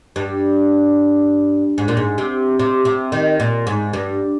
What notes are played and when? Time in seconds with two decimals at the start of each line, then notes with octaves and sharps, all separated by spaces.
0.16 G2
1.78 G#2
1.88 A#2
1.97 G#2
2.18 C3
2.59 C3
2.85 C3
3.12 D#3
3.40 A#2
3.67 G#2
3.93 G2